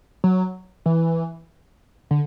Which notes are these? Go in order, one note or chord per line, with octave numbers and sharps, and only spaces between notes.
F#3
E3
D3